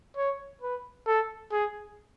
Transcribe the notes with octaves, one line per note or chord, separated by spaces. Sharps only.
C#5
B4
A4
G#4